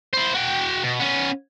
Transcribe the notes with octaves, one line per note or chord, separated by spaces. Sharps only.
E4 C5
F#4 G5
B2
B3 C#4